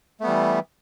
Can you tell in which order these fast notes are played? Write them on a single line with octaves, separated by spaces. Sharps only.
A3 B3 G3 E3